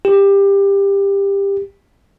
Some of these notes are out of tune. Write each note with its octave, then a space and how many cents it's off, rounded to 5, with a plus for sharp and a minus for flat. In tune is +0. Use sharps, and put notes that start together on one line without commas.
G4 +20